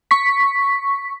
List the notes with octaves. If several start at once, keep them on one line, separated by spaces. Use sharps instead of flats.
C#6 B6